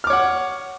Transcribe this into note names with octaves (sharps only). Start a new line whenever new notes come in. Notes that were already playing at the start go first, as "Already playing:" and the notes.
C#5 F#5 D6 F6